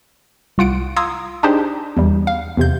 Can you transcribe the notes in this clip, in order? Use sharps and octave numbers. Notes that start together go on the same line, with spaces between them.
C2 F4 F#5 D7
F5 A#5 C6 D#6 E6 G#6
D4 D#4 G4 G#4 C5
E2 G3
F5
E2 C3 G6